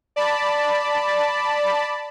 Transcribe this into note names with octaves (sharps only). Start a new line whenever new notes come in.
D5 A5 B5